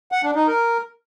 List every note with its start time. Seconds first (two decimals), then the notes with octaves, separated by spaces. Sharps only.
0.12 F#5
0.24 D4
0.36 D#4
0.47 A#4